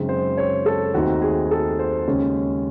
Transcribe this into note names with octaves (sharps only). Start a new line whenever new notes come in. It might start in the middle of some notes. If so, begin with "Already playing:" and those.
Already playing: F#2 C#3 G#3 C4 D#4
C5
C#5
A4
D#2 D#3 A3 C4 D#4 F#4
G#4
A4
C5
D#2 C#3 G#3 C#4